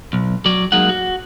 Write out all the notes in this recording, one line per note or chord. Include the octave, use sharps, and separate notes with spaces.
B1
F#3 D5
F#3 G#3 A#3 D#4 F#5
F#4